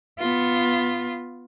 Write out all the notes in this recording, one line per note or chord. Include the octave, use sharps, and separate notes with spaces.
B3 F4